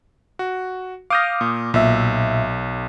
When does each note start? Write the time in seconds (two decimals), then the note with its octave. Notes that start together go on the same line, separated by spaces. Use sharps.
0.39 F#4
1.10 F5 D6 D#6 F6 G6 A#6
1.41 A#2
1.74 B1 A#2 E5